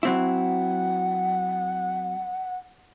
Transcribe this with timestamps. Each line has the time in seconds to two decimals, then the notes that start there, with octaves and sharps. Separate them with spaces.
0.03 F#3 C4 E4 F#5